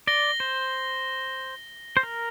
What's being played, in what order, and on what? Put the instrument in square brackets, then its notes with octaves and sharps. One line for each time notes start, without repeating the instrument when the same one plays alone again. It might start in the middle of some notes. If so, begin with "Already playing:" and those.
[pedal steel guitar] D5 [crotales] A#6 G7
[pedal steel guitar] C5
C5
A#4